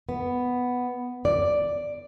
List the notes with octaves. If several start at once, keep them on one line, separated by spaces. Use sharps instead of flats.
B3
D5